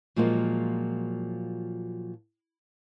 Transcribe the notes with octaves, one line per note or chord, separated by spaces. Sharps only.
A#2 F3 F#3 G#3 A#3 F4